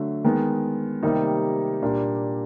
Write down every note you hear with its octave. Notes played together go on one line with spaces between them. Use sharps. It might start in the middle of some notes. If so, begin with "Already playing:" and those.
Already playing: D3 F#3 A3
D#3 G#3 B3
C3 D#3 G3 A#3 D#4
A#2 G3 A#3 D4